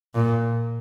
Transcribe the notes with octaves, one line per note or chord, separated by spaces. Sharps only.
A#2